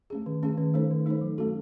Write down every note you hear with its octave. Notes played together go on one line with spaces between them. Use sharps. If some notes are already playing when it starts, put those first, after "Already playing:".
A3 C#4 G#4
D#3
A3 C#4 G#4
D#3
A3 D#4 A4 C5
D#3
A3 D#4 A4 C5
F#3
A3 C#4 F#4 A4